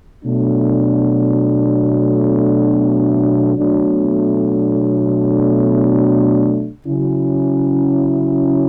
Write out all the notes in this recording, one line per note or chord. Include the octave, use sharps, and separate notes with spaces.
B2 F#3 A3 D4
B2 F#3 A3 D4
C#3 F#3 C#4 E4